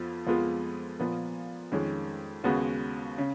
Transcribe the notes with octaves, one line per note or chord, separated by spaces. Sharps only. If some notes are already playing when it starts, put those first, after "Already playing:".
Already playing: F2 F3 B3 F4
F2 F3 G#3 B3 F4
A#2 F3 B3
F2 D#3 G#3 C#4
D#2 C#3 G#3 B3 F#4
C#3